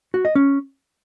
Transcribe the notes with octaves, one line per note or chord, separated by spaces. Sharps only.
F#4
D#5
C#4